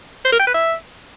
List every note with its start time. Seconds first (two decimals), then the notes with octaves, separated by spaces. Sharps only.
0.25 C5
0.32 A#4
0.40 G5
0.47 B4
0.54 E5